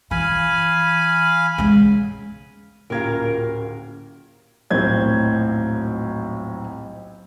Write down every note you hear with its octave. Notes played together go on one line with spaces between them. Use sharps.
E3 F5 G#5 B5
C#3 G#3
D1 A#2 C#4 G4 A#4 F5 G#6
D#1 B1 A2 C4 G6 G#6